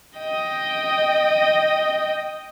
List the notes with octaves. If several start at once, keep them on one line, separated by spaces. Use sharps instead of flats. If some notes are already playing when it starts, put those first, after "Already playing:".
D#5 G5